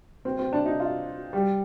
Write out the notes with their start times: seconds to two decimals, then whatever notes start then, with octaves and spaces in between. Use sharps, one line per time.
0.25 C4
0.39 C4
0.53 D4
0.66 D#4
0.80 F4
1.33 G3